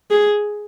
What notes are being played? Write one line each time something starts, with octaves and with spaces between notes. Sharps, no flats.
G#4